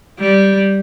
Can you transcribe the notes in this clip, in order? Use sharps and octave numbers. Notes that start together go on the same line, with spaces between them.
G3